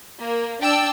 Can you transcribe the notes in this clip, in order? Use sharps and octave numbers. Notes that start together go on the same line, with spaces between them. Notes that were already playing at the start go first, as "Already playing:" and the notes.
A#3
D4 D5 G5 A5 E6